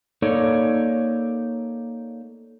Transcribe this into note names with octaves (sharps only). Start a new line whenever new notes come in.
A#3 D#4 A4 C#5 D5